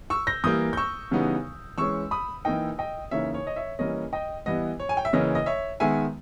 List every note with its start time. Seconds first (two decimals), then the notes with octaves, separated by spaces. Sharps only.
0.10 C#6 E6
0.27 G6 A#6
0.44 E3 G3 A#3 D#6 G6
0.73 G6
0.77 C#6 E6
1.11 C#3 E3 G3 B3 D#4
1.78 E3 G#3 C#4 C#6 E6
2.11 B5 D#6
2.45 E3 A#3 D#4 D#5 G5
2.79 D#5 G5
3.11 C#3 E3 A#3 D#4 C#5 E5
3.34 C#5
3.47 D#5
3.56 C#5 E5
3.79 E3 G3 A#3 C#4 D#5
4.13 D#5 G5
4.46 E3 G3 B3 D#5
4.80 C#5
4.89 G#5
4.97 G5
5.05 E5
5.13 C#3 E3 A#3 C#4 D#5
5.35 D#5
5.46 C#5 E5
5.80 D#3 G#3 B3 E5 G#5